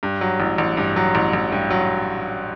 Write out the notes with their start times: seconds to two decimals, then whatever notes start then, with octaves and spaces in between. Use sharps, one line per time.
0.03 G2
0.21 F#3
0.40 A1
0.58 A1
0.77 G2
0.96 F#3
1.15 A1
1.33 A1
1.52 G2
1.70 F#3